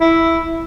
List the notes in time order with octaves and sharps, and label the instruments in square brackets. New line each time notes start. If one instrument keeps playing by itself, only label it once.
[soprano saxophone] E4